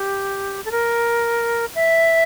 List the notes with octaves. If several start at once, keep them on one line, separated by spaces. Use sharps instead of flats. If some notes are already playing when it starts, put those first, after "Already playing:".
Already playing: G4
A4
A#4
E5